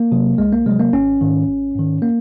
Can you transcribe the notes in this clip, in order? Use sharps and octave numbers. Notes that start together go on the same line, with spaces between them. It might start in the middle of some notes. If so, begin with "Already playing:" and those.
Already playing: A#3
C3 F#3
C2 G#3
A#3
C3 F#3 G#3
A#3
G#1 C#4
G#2 D#3
G#1
G#2 D#3
A#3